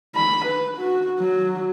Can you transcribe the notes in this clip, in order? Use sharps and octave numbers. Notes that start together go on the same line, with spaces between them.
B5
B4
F#4
F#3